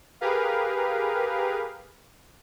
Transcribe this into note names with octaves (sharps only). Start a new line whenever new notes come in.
G4 G#4 A#4 B4 F5